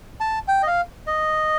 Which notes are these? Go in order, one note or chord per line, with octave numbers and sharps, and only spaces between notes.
A5
G5
D#5
F5
D#5